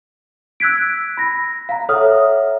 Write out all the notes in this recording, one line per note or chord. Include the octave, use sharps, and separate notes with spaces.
E6 F#6 G#6 B6 D7
B5 A#6
F5 A#5
A4 C#5 E5 F#5 D#6 F6